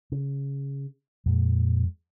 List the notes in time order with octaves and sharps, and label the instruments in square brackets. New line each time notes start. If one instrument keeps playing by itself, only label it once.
[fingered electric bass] C#3
[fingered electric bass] F2 G#3 [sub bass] A#2